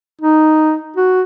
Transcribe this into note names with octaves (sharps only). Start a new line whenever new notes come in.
D#4
F#4